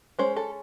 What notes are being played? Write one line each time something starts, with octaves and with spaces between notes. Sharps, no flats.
G#3 C#4 C5
A4